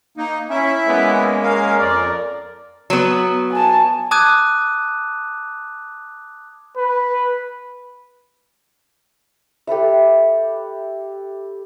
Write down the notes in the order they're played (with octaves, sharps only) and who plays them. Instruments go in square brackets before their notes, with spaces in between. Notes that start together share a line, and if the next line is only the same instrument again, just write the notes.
[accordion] A#3 D#4
[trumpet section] C#4 [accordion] E4 E5
[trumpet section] G#3 A#3 C#4 [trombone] B3
[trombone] A#4 [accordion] F5
[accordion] F2 [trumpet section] D5
[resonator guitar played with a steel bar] F#3 B3
[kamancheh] G#5 A5
[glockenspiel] A5 D6 D#6 F#6 G#6 D#7
[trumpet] B4
[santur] G4 A4 B4 E5